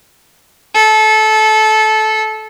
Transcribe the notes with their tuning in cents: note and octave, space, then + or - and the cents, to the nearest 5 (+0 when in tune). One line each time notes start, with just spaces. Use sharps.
A4 -20